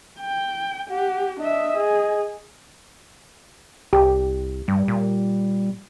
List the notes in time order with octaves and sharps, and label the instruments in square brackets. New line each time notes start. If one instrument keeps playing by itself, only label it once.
[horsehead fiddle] G5
[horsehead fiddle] G4 [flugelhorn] F#5
[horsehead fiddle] D4 E5 [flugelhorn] D#5
[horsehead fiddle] G#4
[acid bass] C2 [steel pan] G4
[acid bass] G2 [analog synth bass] G3
[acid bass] A#2